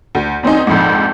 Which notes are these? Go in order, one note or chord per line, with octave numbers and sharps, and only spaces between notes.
D2
E2 C4 C#4 D#4
A#1 F2 G#2